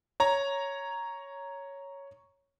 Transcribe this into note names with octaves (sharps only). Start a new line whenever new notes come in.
C#5 A#5